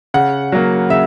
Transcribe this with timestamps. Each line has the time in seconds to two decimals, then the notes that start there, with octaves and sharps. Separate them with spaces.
0.14 C#3 F#5
0.52 F#3 A#3
0.90 C#3 E5